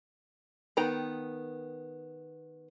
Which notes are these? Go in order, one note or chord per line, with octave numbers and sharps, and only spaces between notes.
D#3 B3 G5 A#5